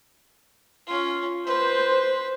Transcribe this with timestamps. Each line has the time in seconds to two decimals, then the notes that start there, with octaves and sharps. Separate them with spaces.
0.86 C#4 F4
1.47 B4 C5